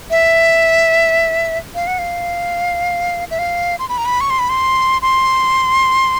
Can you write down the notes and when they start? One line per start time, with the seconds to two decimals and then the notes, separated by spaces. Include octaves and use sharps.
0.11 E5
1.75 F5
1.87 F#5
1.99 F5
3.31 E5
3.39 F5
3.79 C6
3.89 B5
3.98 A#5
4.05 B5
4.21 C#6
4.30 C6
4.39 B5
4.49 C6
5.02 C6